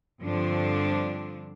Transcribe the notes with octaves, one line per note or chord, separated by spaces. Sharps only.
G2 D3 F3 C4 D4